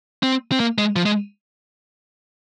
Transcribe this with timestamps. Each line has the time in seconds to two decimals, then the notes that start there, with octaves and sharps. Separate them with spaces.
0.23 C4
0.52 C4
0.60 A#3
0.78 G#3
0.96 F3
1.06 G#3